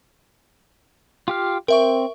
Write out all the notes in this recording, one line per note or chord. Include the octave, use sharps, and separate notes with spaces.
F4 G4 F5
C4 A#4 E5 C#6